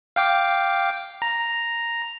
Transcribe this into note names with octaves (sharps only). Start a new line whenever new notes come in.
F5 G5 D6
A#5